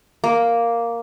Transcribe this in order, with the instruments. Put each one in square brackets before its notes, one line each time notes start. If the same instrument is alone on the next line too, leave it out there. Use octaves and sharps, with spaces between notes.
[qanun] A#3